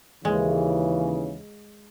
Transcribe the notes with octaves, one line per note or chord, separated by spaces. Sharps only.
D#2 C#3 E3 G#3